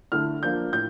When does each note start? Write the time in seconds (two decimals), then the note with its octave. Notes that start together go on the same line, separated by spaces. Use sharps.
0.12 D3 A3 E4 F6
0.43 F3 A#3 D4 G6
0.73 A2 G6